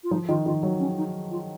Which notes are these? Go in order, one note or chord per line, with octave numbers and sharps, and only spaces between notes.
F4
F3 D#4
D#3 F4
D#3 F4
F#3
C#4
D#4
F4